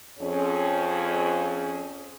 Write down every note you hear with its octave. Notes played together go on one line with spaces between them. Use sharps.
F2 C#4 G#4